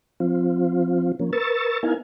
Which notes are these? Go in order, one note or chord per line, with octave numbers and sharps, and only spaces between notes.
F3 C4 F4
F3 A#3 C#4
A#4 B4 C#6 E6 A6
B3 D#4 E4 A#4 F5 G#5